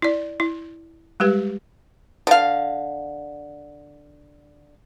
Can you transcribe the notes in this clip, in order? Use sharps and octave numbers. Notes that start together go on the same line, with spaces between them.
E4 D5
E4
G3 G#3 G4 B4
D3 F5